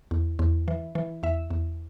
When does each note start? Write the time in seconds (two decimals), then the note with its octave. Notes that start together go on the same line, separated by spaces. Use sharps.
0.11 E2
0.39 E2
0.68 E3
0.95 E3
1.23 E2 E5
1.51 E2